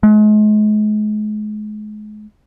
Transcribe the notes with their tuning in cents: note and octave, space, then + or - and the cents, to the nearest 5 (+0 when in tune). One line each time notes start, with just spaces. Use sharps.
G#3 +35